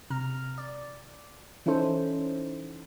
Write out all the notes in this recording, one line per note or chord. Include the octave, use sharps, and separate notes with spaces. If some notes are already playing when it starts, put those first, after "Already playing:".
C3 A#5 F6
D5
E3 C#4 D#4 E4 A4 C5